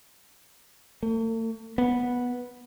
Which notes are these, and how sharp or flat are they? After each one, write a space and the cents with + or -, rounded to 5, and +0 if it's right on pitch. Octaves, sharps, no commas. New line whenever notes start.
A3 +45
B3 -10